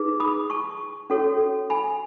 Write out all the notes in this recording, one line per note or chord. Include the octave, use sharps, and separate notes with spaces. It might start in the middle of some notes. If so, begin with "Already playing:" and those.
Already playing: D#4 G#4 B4
B5 D#6
A5 C#6
C#4 F#4 A4 C#5
G#5 B5